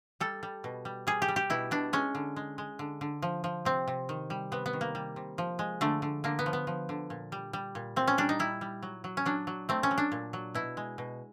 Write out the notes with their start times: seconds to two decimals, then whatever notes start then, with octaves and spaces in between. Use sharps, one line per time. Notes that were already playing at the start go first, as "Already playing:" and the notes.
0.20 G3 A4
0.43 G3
0.64 B2
0.85 G3
1.07 G3 G#4
1.22 G4
1.28 G3
1.36 G4
1.50 B2 E4
1.71 B2 D4
1.93 G#3 C#4
2.15 D3
2.36 G#3
2.58 G#3
2.79 D3
3.01 D3
3.22 F3
3.44 F3
3.65 C3 C4
3.88 C3
4.09 D#3
4.30 G3
4.52 C3 B3
4.66 B3
4.73 D#3
4.81 A#3
4.95 G3
5.16 C3
5.38 F3
5.59 G#3
5.81 D3 A3
6.02 D3
6.24 D3 A#3
6.39 B3
6.46 F3
6.53 B3
6.67 F3
6.89 D3
7.10 A#2
7.32 G3
7.53 G3
7.75 A#2
7.96 A#2 C4
8.07 C#4
8.18 G3 D4
8.29 D#4
8.39 G3 E4
8.61 G3
8.83 F#3
9.04 F#3
9.17 C#4
9.26 F#3 D4
9.47 F#3
9.69 A3 C4
9.83 C#4
9.91 F#3
9.98 D4
10.12 A#2
10.33 F#3
10.54 B2 E4
10.77 G#3
10.98 B2